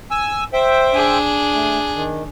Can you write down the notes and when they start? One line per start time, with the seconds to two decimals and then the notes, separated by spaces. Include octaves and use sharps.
0.11 G#5 E6
0.53 C5 E5 G5
0.92 D4 G#4
1.54 A3
1.95 D#3